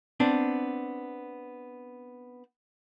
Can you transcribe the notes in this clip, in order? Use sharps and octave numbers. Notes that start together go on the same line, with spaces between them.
B3 C4 D4